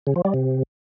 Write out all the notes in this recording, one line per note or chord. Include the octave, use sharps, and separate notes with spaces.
C#3
F3
G3
C3